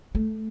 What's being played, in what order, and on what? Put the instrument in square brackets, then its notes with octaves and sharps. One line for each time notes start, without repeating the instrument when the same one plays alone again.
[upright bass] A3